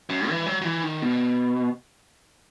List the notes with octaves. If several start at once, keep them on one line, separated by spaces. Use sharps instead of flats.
F#2
E3
F#3
F#3
E3
D#3
B2